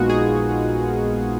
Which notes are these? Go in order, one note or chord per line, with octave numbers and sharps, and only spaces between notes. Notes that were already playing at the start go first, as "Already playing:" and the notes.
Already playing: A#1 A#2 G#3 B3 D#4 F4 F#4
G#4